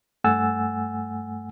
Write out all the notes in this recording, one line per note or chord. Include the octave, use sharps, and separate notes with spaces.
G2 A3 F#5 G#5 E6 A6